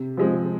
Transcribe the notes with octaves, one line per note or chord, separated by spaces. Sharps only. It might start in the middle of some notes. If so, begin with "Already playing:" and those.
Already playing: C3
F3 G#3 C4